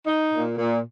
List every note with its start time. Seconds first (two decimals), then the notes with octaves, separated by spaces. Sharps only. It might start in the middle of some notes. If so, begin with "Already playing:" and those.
0.07 D#4
0.33 A#2
0.58 A#2